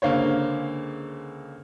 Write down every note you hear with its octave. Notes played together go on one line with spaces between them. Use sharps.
C#2 D3 A#3 C5 C#5